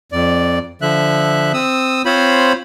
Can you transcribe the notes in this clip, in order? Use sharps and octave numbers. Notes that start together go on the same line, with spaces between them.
F2 D5
D3 F3 E5 F#6
C4 D#6 E6
C4 F4 C5 C#5 B5